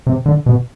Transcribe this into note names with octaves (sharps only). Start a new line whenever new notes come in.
C3
D3
B2